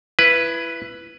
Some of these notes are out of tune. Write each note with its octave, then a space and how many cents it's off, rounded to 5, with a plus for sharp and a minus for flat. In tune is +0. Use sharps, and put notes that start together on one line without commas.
E4 +25 B4 +0